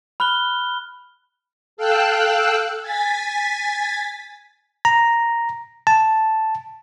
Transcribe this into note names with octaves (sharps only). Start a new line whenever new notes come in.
B5 F6 F#6 G7
A4 F5 G5 E6 F#6
G#5 A6 B6
A#5
A5